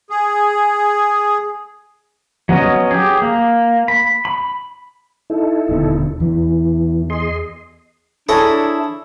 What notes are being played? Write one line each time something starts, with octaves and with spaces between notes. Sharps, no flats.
G#4
F#3 B3 C#4 D#5
G4 G#4
A#3
B5
B5
D#4 E4 A4
D#1 B2 D3
E2 E3
G#4 D#5 C6
D4 E4 G#4 A4 C#5 A#5